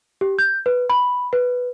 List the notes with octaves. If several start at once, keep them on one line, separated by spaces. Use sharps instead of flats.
G4
G6
B4
B5
B4